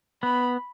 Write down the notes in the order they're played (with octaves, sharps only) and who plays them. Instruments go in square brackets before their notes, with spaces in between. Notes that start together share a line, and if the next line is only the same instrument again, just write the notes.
[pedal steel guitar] B3 [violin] B5